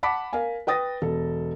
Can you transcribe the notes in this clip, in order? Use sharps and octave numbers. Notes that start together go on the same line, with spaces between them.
F#5 A5 B5 D6 B6
A#4 F5 G#5
B4 G5 D#6 A6 A#6
E1 A4